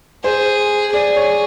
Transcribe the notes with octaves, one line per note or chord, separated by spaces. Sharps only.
G#4 C5
G#4 D5
C#5